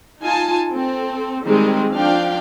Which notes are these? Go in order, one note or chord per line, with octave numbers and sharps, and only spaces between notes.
D#4 F4 G#5 A5
C4 A4
D#3 G3 G#3 C4 G#4
F3 D4 F5 G5